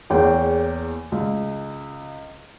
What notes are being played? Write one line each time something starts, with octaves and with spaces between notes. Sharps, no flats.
E2 A#3 G#4 C#5 G5
C#2